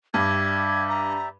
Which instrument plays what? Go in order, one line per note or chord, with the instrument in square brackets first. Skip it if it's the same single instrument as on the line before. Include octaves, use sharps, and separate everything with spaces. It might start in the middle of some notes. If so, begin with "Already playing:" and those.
[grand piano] G2 [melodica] G4 D5 E5 [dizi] G#6
[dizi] A#5